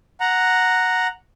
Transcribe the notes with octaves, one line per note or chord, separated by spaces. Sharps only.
F#5 A#5